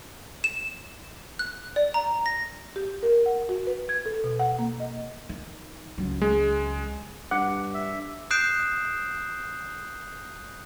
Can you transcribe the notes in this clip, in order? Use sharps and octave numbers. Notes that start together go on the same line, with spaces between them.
E7
F#6
D5
A#5
A#6
G4
A#4
F#5
F#4
B4
G#6
A4
B2
F#5
A#3
D#5
D#3
C#2 F#3
G#3
G2 F#5 D6
E5
D#6 F#6 G6 C7 D7 E7